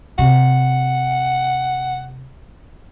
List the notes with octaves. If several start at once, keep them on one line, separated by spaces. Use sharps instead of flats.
C3 F#5